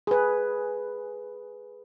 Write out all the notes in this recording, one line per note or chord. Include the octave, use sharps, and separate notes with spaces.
G#4 B4